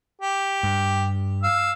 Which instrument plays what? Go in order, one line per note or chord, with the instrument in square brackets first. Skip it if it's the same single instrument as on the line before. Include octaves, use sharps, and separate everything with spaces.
[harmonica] G4
[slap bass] G2
[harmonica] F5 E6